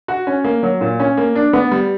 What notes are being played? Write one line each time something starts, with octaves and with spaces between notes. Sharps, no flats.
F#4
C#4
A#3
F#3
A#2
C#4
A#3
D4
B3
G3